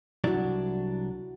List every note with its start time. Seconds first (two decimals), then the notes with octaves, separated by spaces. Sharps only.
0.24 C2 F#3 D4 E4 F#4